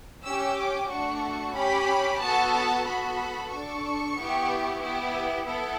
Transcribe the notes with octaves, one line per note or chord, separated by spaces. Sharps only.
C#4 G4 E6
D6
A3 D4 F#4 A4 C#6
C#4 G4 B5
B3 F#4 A4 A5
A5
B3 F#4 A4 B5
D4 A4 C#6
B3 E4 G4
B3 E4 G4
B3 E4 A4